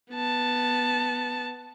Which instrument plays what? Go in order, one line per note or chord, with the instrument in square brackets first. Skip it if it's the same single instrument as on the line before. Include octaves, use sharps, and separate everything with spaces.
[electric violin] B3 A5